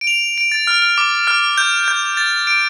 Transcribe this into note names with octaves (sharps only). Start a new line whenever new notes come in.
D7
F7
D7
A6
F6
F6
D6
F6
G6
G6
A6
D7